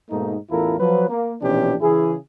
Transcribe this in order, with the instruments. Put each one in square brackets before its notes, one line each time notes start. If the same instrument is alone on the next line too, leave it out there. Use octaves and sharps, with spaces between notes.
[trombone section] G#2 B2 A3 A#3 D#4
A1 E2 E4 F4 A4 A#4
F3 F#3 B4
A#3
A#1 B2 E3 C#4 D4 G4
C#3 E3 E4 G#4